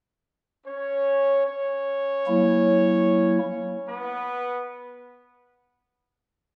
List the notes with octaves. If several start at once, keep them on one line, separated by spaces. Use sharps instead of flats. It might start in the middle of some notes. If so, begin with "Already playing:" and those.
C#4 C#5
C#4 C#5
F#3 A#3 E4
B3 B4